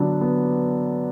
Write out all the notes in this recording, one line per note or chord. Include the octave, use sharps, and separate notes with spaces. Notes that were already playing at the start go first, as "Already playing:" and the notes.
Already playing: D3 F#3 B3 D4
B3